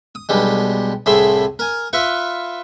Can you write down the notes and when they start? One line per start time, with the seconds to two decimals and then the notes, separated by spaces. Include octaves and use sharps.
0.15 D#6
0.29 B1 G2 G3 G#3
1.06 C2 A2 G#4 E5 B5 C6
1.59 A#4 G#5
1.93 F4 B4 E5 C#6